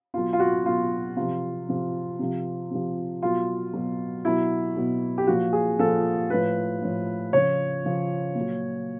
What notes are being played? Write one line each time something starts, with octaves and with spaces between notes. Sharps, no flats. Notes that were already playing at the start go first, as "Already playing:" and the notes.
B2 F#3 F4
F4
F#4
B2 F#3 F4
C3 F3 F4
C3 F3
C3 F3
C3 F3
B2 F#3 F4
B2 F#3
B2 F#3 E4
B2 F#3
G4
A#2 F3 F#4
G#4
A#2 F3 A4
A2 F3 B4
A2 F3
C#3 F3 C#5
C#3 F3
A#2
F#3